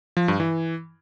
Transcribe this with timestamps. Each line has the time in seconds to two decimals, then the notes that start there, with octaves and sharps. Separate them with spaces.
0.17 F3
0.28 G2
0.40 E3